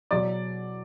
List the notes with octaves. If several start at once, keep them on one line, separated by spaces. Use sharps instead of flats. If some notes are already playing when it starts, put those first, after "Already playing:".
B2 F#3 D5